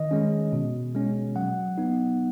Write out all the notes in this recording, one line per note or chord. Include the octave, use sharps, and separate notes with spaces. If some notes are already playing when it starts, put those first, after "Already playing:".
Already playing: D#3 D#5
G#3 C#4
B2
G#3 C#4
F#3 F#5
B3 D#4